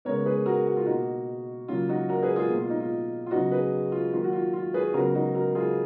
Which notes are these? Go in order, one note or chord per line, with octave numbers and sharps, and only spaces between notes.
C#3 G#3 B3 A#4 C#5
G#4 B4
F#4 A#4
F#4
F4
B2 A#3 D#4 F#4
C#3 F#3 A#3 F4
D#4 F#4
F#4 A#4
G#4 B4
F4 G#4
B2 A#3
F4
D#4
F4
F4
C#3 F#3 B3 D#4 F#4
G#4 B4
F4
D#3 F#3 A#3 F4
F#4
F4
F4
G#4 B4
C#3 F#3 B3 F#4 A#4
D#4 F#4
F#4 A#4
F4 G#4